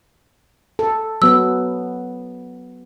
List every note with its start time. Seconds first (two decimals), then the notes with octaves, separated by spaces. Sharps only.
0.79 A4
1.22 F#3 B3 E6